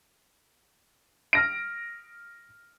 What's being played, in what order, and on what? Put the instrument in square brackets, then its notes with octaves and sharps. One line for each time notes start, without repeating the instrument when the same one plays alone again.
[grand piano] F6 A#6 D7